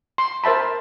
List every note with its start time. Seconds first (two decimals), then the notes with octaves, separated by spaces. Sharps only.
0.18 C6
0.44 A#4 C5 E5 A5 B5